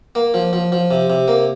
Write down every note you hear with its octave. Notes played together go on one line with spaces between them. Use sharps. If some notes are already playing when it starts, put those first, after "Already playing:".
A#3
F3
F3
F3
C3
C3
A#3